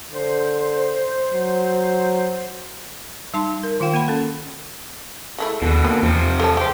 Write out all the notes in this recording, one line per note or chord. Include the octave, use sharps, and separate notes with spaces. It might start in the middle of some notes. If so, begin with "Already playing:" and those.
D3 C5
F#3
G3 D#4 A5 C6
A#4
D#3 F4 F5 G5
A#3 F#5 G5 B5
C#4 A4
G#3 A3 E4
D#2 B2 D3
A3 A#3
E2 C3 F3
A4 C#5 A5
G#3 G4 C5